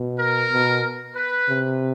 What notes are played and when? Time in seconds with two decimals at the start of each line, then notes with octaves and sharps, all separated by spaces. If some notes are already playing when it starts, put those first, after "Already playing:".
Already playing: B2
0.20 A#4
0.53 B2
1.16 B4
1.49 C3